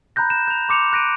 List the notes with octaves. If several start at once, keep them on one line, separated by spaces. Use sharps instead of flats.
A#5 B5 F#6 G6 A#6
E7
G6 F7
C6 D6 C#7 E7 F7
F#6 A#6 D7 D#7